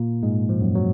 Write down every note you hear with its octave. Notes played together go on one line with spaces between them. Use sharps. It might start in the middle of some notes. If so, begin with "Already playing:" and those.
Already playing: A#2 A#3
G#2 G#3
F3
F#2 F#3
F#3